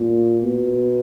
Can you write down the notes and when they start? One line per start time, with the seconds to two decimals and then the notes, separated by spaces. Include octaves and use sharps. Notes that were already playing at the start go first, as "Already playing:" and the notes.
Already playing: A#2
0.43 B2